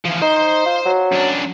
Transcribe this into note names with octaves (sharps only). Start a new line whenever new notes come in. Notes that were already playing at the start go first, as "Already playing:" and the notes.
E3 F3
D#4 C5 C6
F4
F#3
F#2 D4